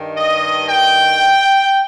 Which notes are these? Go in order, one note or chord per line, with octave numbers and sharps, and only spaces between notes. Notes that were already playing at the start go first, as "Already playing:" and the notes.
Already playing: G2 D#3
D#5
G5